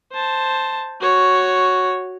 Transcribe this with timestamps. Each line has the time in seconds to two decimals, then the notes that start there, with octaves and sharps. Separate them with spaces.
0.12 C5 A5
1.01 F#4 C#5